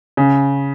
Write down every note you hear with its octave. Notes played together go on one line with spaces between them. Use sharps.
C#3